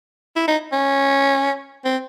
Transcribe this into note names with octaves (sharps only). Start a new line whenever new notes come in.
E4
D#4
C#4
C4